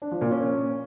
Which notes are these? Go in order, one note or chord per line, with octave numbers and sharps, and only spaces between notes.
D4
F3
A#2
C#4